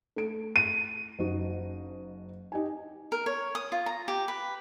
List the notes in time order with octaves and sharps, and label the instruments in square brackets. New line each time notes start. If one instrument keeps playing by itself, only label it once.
[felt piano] A3 D7
[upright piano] D#7
[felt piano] F#1 D#4 F#4
D#4 G4 G#5
[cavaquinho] A#4
C#5
D#6
F4
A#5
G4
B4